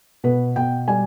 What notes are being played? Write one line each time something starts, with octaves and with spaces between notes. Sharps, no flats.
B2 B4
B2 G5
G3 G#5